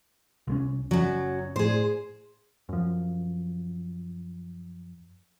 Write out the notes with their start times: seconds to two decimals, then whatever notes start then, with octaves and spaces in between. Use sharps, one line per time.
0.48 C2 G#3 C#4
0.91 F#1 F#2 F#3
1.56 A2 G#4 C5
2.69 F#2 F3